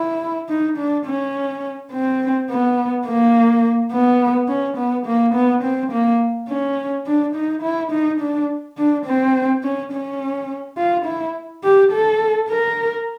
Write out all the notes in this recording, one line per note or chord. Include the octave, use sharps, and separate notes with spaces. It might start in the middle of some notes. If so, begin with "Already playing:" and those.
Already playing: E4
D#4
D4
C#4
C4
B3
A#3
B3
C#4
B3
A#3
B3
C4
A#3
C#4
D4
D#4
E4
D#4
D4
D4
C4
C#4
C#4
F4
E4
G4
A4
A#4